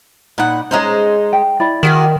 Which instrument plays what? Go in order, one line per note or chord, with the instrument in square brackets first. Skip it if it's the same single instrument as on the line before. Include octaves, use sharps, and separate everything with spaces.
[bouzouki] A#2 F#5 [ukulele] D#4 B5
[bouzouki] G#3 D#4 C5 [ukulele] C#4 A#5
[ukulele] G5
E4 D5 B5
[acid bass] D#3 [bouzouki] D4 F#4 G#4